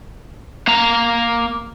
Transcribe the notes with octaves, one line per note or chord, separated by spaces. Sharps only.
A#3 A#5